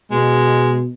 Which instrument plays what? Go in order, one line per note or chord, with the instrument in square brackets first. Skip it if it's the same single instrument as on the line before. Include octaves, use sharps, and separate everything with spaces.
[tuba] B2 [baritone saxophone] G#3